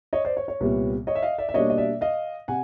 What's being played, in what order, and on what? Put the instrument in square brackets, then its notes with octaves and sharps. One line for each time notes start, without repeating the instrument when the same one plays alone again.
[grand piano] C#5 D#5
C5 D5
C#5
C#5
C2 A#2 G3 B3
C#5 D#5
E5
D#5 F5
D5 E5
E5
B2 G3 A#3 D4 C#5 D#5
D#5
D5 E5
D#5 F5
C3 F#5 G#5